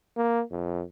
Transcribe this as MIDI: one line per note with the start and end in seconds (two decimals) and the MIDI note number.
0.17 0.42 58
0.51 0.84 41